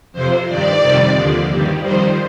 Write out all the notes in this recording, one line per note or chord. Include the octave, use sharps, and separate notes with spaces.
F2 C3 F3 C5
G2 D#3 G3 D5
F2 C3 D#3 G3
D#2 D3 F3
G2 D#3 G3
F2 D#3 G3 C5